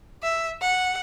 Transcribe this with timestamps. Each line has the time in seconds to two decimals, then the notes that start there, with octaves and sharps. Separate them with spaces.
0.22 E5
0.61 F#5